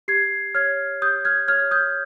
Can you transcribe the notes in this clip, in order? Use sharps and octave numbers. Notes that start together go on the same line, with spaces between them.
G4 G#6 C7
C#5 F6 G#6
G4 D#6 G6
F6 G#6
C#5 F6 G#6
D#6 G6